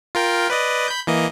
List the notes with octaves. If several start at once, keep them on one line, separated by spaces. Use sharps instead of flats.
F4 A#4 G5
B4 D5 D#5
B5 G6
E3 A#3 D#5